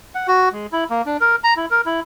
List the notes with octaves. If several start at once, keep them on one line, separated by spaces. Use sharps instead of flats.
F#5
F#4
G#3
E4
A#3
D4
A#4
A#5
E4
A#4
E4